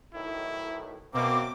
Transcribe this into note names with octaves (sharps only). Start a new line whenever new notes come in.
B1 A2 D#3 E4
F#2 B2 A#3 C4 D6